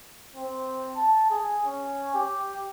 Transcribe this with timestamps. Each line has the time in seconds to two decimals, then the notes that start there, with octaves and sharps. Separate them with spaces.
0.36 C4
0.97 A5
1.31 G#4
1.66 C#4
2.14 G4